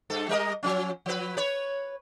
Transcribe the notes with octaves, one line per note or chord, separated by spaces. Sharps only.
G2 A4
G3 A#4 D#5
F3 F#3 C#4
F3 B4
B4 C#5